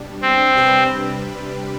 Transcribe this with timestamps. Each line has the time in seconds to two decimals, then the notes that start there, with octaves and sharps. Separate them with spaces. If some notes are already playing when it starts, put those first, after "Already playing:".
Already playing: B2 G3 D4
0.22 C4
0.56 C3 G3 D4 G4 B4